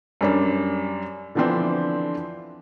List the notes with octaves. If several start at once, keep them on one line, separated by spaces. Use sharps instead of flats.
F#2 G3 D4
D3 E3 F3 B3 C4 D4